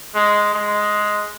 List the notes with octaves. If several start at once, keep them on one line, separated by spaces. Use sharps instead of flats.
G#3
G#3